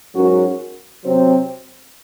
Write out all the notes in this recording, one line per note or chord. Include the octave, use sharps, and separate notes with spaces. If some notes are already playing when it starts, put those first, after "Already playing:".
G#2 F#3 C#4 F#4 A#4
C3 F#3 C4